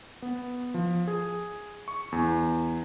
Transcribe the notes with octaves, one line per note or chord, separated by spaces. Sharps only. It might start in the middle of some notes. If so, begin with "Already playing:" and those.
B3
F3
G#4
C#6
E2